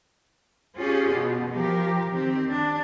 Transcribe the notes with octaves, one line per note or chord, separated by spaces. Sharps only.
C#4 F4 G4 G#4
B2
F3 G4 A#4
D#3 C4 G4
D4